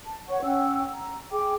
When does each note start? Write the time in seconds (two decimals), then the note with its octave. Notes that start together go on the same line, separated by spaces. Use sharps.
0.06 A5
0.28 B4 C#5 F#5 C#6
0.43 C#4 F#5 G5 E6
0.92 A#5
1.31 G#4 G5 D6